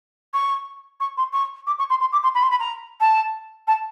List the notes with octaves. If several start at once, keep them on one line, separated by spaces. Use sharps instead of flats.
C#6
C#6
C6
C#6
D6
C#6
C6
C6
D6
C6
B5
C6
B5
A#5
A5
A5